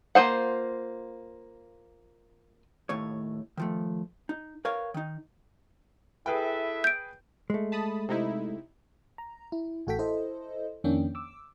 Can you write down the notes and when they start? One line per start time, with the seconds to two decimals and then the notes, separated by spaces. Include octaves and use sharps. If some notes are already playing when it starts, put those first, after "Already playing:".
0.15 A#3 F4 C5 F#5
2.89 D#2 A2 C#5
3.57 D#3 F3 A3
4.29 D#4
4.65 A#4 B4 C#5 F5
4.94 D#3 D#4
6.26 E4 G#4 A4 B4 E5 G5
6.84 G6 D7
7.50 G#3 A3
7.72 A5 B5 D#6
8.09 C3 D#4 E4
9.18 A#5
9.52 E4
9.87 A1 A2 F#4 A4 G5 B6
9.99 E4 A4 C5 D#5
10.84 F2 D#3 A#3 C#4 D4 G5
11.15 D6 E6